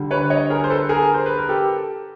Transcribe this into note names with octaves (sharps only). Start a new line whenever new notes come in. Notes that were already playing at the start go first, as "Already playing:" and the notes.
Already playing: D3 G3
B4 C#5
C#5 D#5
G#4 A#4
C5
A4 B4
G#4 A#4
C5
B4
A#4
G4 A4